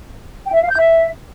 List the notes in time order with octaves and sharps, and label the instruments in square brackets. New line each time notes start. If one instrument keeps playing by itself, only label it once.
[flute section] G5
E5
F5
G6
E5